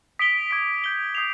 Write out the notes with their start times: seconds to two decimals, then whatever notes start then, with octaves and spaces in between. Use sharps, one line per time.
0.19 D#6 B6 D7 G7
0.51 D6 G#6 B6 D7
0.84 G6 D7 G7
1.15 D#6 G6 C7 F7